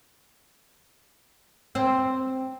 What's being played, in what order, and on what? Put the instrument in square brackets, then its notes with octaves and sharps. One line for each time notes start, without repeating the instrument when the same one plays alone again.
[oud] C4